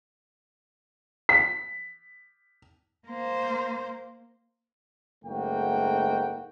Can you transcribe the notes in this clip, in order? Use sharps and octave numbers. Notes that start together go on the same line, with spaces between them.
B6
A#3 C5
F#1 G#2 A3 A#3 F#4 G5